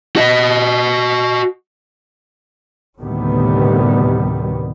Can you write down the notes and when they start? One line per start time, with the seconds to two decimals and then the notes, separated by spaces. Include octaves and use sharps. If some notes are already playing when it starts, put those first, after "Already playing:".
0.16 F#4 D#5
3.00 D2 A2 C3 D#3 G3 B3